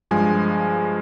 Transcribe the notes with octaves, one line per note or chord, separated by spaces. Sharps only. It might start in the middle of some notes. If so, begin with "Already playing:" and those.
G2 F3 G#3 G#5